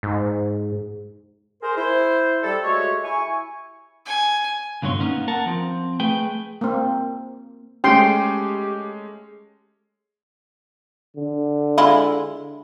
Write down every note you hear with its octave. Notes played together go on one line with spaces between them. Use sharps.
G#2
G#4 A#4 C5
E4 C5
G3 A4
G#3 A3 F#4 G4 C#5
E4 G#5 C#6
G#5
C#2 G2 B2 D3 C#5 C6
A#3 B3 C#4 D#4
A#4 F#5 A5
F3 C4
A3 G#4 B4 G5
A#3 C4
G#3 A3 C#4 G4 G5 C6
D3
G#3 E4 F4